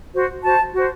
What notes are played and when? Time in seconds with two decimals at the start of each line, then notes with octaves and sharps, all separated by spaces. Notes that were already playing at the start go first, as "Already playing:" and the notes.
0.14 F#4 C5
0.43 F#4 C5 A5
0.74 F#4 C5